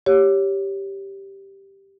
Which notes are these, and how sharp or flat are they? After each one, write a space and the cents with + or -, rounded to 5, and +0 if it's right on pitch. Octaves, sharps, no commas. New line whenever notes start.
G4 +0 C#5 +5